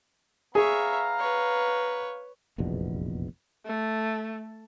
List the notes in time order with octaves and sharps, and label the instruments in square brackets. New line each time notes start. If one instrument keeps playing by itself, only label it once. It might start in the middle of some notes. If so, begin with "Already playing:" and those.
[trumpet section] B3 F5 A#5 [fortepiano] G#4 [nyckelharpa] C#5 E5
[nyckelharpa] B4 C#5
[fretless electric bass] F1 A#1 E2 B2
[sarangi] A3